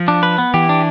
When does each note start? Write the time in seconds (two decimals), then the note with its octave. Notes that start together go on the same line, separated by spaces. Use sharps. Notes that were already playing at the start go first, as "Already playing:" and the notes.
Already playing: F3
0.08 D4
0.23 B4
0.38 B3
0.54 E3 G4
0.69 D4